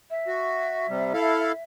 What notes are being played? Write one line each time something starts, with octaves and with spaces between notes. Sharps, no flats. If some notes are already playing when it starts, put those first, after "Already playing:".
E5
F#4
C3 G3
E4 A4 F5